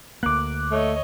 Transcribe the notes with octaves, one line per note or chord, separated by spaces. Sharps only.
D2 A#3 D6 F#6
A3 C#5 D#5